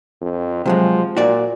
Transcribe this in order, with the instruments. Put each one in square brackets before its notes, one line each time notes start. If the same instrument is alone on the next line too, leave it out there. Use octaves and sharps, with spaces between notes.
[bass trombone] F2
[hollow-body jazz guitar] C3 F#3 G#3 [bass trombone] F3
[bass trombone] A#2 [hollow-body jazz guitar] F#4 D5